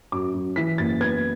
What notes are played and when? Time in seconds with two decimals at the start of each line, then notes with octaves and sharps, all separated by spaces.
0.12 F#2 D6
0.34 F#2
0.56 E3 B6
0.78 F#1 A6
1.00 B3 G#6